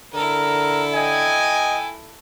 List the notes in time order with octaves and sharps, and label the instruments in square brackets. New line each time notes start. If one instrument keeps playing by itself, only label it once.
[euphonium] D3 [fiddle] E4 A4 [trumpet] A#4
[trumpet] D#5 [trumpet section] G5 G#5